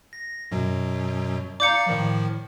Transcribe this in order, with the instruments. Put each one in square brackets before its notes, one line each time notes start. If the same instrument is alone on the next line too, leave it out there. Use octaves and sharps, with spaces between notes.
[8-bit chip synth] A#6
F#2 B2 F#3
[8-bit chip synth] D5 F5 A#5 [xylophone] D6 G6 C#7
[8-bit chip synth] A2 D#3 F3